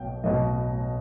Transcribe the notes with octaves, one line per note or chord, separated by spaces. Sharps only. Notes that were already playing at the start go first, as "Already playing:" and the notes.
Already playing: B1 B2 G5
B1 B2 D#5